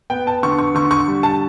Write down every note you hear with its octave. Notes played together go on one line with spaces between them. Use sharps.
B3 G5
A5
D3 C#6
C#6
D3 C#6
C#6
G3
A5